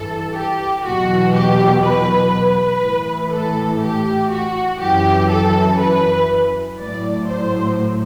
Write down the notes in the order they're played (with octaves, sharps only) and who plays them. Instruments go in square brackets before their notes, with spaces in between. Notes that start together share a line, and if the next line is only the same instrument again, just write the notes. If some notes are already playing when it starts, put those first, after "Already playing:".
Already playing: [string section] G2 E3 A4
G4
E2 B2 F#3 F#4
G4
B4
B4
A2 E3
A4
G4
F#4
F#2 E3 G4
A4
B4
A2 F#3 D5
C5